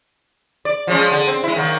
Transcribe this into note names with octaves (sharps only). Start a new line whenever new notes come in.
D5
F3 G#3 C#4
D3
C4
G#3 E4
D#3 F#3 A#3